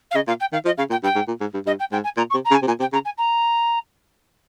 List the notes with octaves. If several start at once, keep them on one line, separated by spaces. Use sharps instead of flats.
F5
C#3 D#5
A#2 F5
G5
D#3 F5
F3 D#5
C#3 F5
A#2 G5
G2 G5
G#2
A#2
G#2
G2
G2 D#5
G5
G#2 G5
G#5
A#2 A#5
C#6
C3
A#5
C#3
G#5
C3
A#2 G#5
C3 G5
C#3 A#5
G#5
A#5